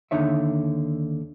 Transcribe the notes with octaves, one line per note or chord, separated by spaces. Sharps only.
D#2 D3 D#4 C#5 E5